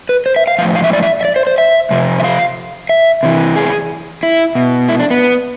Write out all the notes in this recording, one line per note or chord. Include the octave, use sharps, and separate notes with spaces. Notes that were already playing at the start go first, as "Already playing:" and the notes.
B4
C5
E5
F5
A2 F3 F5
F5
E5
D5
E5
E5
D5
C5
C5
E5
C3 F3
E5
F5
E5
C3 E3
G#4
E4
B2
E4
D4
B3